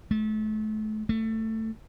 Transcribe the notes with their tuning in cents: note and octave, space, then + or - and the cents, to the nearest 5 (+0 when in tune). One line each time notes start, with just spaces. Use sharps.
A3 -35
A3 +15